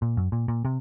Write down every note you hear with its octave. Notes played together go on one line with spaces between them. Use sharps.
A#2
F#2
A#2
A#2
C3